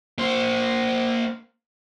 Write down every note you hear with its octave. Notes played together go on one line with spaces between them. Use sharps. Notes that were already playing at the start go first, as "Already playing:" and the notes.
A#3 C5